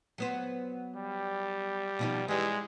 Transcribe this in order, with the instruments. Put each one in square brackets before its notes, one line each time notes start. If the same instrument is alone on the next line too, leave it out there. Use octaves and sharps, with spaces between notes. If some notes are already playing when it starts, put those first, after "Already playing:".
[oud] F#3 B3 C5
[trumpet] G3
[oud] B2 F3 D#4
[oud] E3 G3 [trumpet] G#3